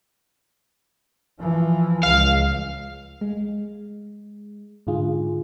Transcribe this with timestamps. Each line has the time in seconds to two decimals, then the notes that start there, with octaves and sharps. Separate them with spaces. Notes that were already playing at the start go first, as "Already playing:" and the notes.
1.40 E3 F3
2.03 C#2 F5
3.21 G#3
4.87 G#2 D3 F4 G#4